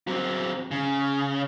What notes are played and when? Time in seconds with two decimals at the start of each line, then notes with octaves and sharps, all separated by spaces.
0.08 F#3 C4
0.71 C#3